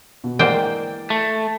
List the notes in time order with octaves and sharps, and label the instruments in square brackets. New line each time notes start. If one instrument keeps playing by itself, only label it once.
[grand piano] B2
[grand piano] E3 D5 G6 [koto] G#3 A#3 C5 [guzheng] G5
[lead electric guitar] A3